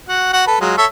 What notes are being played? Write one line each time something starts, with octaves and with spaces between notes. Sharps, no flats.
F#4 F#5
F#4 F#5
A4 B4
F#3 G#3 F4
A4 C#5 E5